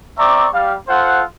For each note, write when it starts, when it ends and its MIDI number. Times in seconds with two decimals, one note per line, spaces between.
0.18 0.48 60
0.18 0.48 74
0.18 0.48 76
0.18 0.48 82
0.18 0.48 85
0.18 0.48 86
0.54 0.75 55
0.54 0.75 77
0.88 1.23 65
0.88 1.23 69
0.88 1.23 72
0.88 1.23 78